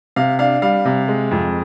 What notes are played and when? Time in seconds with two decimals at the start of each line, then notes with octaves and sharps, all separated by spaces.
0.16 C3 F5
0.39 D4 F5
0.62 G3 F5
0.85 C3
1.08 G#3
1.31 F2